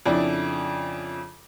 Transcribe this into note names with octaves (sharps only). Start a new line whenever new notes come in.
F2 C#3 D4 E4 D5